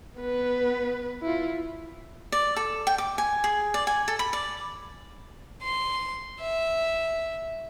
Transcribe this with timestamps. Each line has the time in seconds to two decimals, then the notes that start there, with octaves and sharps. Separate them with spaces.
0.20 B3 B4
1.23 E4 F4
2.32 D5
2.56 A4
2.87 G5
2.98 D6
3.18 G#5
3.44 G#4
3.74 D5
3.87 G#5
4.08 A4
4.19 B5
4.33 D5
5.63 C6
6.41 E5